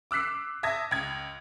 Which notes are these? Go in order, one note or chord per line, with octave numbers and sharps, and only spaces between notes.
D6 E6 F#6 B6 C7
E5 A5 D#6 G#6 A#6
C#2 G#6